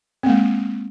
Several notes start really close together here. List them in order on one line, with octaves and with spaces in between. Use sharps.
C4 A#3 G#3